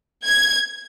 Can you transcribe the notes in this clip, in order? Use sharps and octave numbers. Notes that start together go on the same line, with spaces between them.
G#6